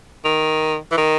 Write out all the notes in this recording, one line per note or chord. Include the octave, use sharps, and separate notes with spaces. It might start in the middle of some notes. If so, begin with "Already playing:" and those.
D#3
E3
D#3